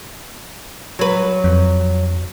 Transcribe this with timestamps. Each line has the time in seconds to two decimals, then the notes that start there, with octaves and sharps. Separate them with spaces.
0.99 F#3 B4
1.44 F2